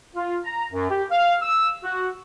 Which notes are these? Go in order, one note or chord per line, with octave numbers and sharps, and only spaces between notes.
F4
A#5
F#2
G4
F5
E6
F#4